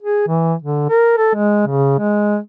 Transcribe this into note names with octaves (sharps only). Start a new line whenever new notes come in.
G#4
E3
D3
A#4
A4
G#3
C#3
G#3